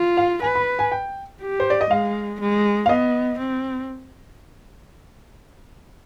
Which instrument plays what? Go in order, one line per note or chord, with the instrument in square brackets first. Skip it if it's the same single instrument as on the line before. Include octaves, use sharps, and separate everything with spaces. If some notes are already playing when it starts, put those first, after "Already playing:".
Already playing: [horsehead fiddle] F4
[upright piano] F5
[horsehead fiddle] B4 [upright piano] G#5
[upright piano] B5
G#5
G5
[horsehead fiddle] G4
[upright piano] C5
D5
D#5
[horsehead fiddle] G#3 [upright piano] F5
[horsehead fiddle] G#3
[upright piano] F5
[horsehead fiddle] B3 [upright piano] D#5
[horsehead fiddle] C4